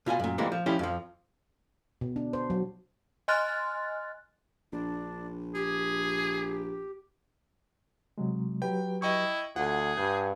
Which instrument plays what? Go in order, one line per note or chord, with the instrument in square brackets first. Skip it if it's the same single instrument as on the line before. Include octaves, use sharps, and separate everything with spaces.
[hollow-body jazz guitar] B2 F4 E5 G#5
F#2 A#2
A#2 E3 G3 G#3 A#3 C4
F3
F3 C#4 E4 G4
F2 F3
[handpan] B2
D4
C5
F#3
[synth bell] D#5 G#5 C6 F6 F#6 A6
[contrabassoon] A#1 [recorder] D4
[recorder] G4 [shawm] G#4
[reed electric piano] C3 F#3 G#3
[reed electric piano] F#3 G4 B4 [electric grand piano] G5
[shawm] E4 [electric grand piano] D#5 G5 C#6
[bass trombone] D2 [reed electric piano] F4 [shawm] G#4 [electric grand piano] F#5
[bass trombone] G2 [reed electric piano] G#5 G6